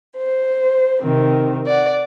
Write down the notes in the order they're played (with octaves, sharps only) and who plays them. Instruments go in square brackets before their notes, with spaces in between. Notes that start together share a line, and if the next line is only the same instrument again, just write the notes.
[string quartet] C5
C3 D#3 C4
D5 F#5